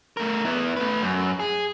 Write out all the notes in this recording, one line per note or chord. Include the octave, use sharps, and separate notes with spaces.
A3 A#4
B3 E4
A3 B4
F#2
G#4